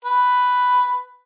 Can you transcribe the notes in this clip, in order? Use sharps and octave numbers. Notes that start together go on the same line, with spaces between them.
B4